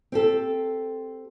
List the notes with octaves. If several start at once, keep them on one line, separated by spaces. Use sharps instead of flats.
C4 G4 A4